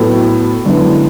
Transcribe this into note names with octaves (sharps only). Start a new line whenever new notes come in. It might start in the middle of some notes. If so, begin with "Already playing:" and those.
Already playing: A2 F#3 B3 F#4 A4
F#2 D3 G#3 B3 E4